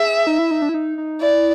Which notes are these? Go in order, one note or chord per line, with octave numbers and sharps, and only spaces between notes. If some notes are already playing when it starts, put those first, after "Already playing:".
Already playing: G#4 E5
D#4
E4
D#4
D4
E4
D#4
D#4
E4 D5